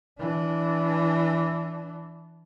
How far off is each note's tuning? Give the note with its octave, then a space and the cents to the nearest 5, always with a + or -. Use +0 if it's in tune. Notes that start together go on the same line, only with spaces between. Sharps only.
E3 +0 D4 -20